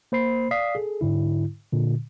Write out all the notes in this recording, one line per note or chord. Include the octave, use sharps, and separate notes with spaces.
A#3 C5 B5 C7
D5 F5 D#6 B6 C7
G#4 A4
G#2 D3 E4
A#2 D3